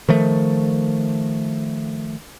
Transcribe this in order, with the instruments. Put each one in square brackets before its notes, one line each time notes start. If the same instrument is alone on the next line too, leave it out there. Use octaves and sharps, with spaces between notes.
[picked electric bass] D#3 F3 A3